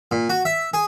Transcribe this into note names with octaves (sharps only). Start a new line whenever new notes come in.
A#2
F#4
E5
G#4